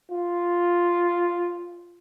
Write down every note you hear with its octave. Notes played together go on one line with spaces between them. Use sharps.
F4